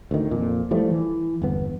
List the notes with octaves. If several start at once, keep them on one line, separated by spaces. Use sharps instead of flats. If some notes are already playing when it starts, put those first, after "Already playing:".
D2 D#3
F2 A#2
E3 F3 G3 A3
E3
G1 E2 B3